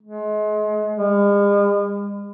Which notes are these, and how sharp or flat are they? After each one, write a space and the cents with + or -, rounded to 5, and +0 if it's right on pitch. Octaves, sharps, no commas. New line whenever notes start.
G#3 +35
G#3 -45